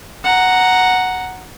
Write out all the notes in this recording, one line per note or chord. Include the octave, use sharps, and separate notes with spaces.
F#5 A#5